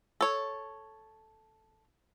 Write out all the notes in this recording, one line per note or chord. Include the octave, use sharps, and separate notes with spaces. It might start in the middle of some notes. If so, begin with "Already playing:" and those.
A4 C#5